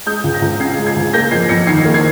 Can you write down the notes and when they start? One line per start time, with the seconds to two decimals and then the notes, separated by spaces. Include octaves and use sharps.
0.06 G#3 D#6 G6
0.24 C#2
0.34 G6 A#6
0.42 C#2
0.60 C#3 G#6 C7
0.79 G#3
0.86 G#6 C7
0.96 C#2
1.13 A#3 G6 A#6
1.31 F2 G#6 C7
1.49 F2 A#6 C#7
1.67 D#3 G#6 C7
1.85 A#3
1.94 G#6 C7